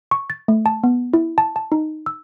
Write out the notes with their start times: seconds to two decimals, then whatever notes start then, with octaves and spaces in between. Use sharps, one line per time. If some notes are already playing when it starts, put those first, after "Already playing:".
0.11 C#6
0.30 A6
0.48 A3
0.66 A5
0.84 B3
1.13 E4
1.38 A5
1.56 A5
1.72 D#4
2.06 E6